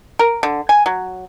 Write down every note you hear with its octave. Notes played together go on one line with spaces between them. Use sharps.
A#4
D3
G#5
F#3